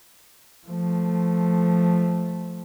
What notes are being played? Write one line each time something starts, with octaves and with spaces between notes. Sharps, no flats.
F3 A3